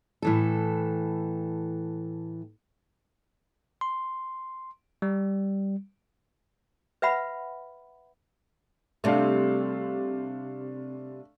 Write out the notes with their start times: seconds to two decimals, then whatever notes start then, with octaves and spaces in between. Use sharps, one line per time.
0.22 A2 E3 A4
3.81 C6
5.02 G3
7.02 B4 E5 F#5 B5
9.04 C3 G3 A3 D4 F5